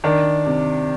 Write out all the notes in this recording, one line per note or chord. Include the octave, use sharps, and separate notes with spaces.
D#3 D4
C3